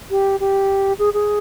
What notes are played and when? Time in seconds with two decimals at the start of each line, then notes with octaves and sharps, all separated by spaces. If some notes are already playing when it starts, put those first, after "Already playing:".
0.10 G4
0.40 G4
0.99 G#4
1.14 G#4